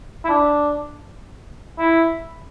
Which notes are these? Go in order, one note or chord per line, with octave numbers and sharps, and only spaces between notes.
E4
D4
E4